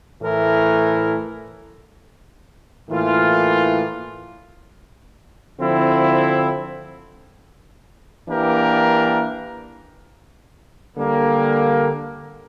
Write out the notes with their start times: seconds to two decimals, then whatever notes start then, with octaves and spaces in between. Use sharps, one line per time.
0.21 A2 E3 A3 E4 A#4
2.90 A2 E3 A#3 F4
5.59 D3 F3 C4 E4
8.28 E3 A#3 D4 G4 A#4
10.96 D3 G3 A#3